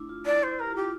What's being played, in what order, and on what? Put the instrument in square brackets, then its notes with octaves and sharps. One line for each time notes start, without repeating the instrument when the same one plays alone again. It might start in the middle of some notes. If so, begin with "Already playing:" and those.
Already playing: [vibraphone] A3 D4 E4
F4
[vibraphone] E4 [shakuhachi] D5
[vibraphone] E4 [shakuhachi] C5
[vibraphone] G4 [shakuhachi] A#4
[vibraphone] F4
[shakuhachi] G4